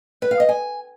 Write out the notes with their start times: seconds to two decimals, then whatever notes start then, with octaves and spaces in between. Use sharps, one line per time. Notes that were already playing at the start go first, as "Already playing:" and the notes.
0.22 B4
0.31 F5
0.40 D#5
0.49 G#5